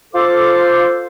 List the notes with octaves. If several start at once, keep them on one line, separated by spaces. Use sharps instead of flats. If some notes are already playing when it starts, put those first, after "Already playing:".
F4 A4 C5 D6